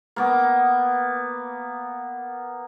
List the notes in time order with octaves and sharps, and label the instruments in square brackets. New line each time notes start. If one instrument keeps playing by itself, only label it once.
[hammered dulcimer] A#3 B3 D6